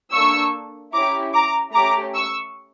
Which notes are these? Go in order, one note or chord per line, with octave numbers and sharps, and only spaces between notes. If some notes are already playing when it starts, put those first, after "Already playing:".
A#3 D4 A4 C#6 E6
C#4 E4 G4 A#5 D6
A#5 D6
A3 C#4 G4 A#5 D6
C#6 E6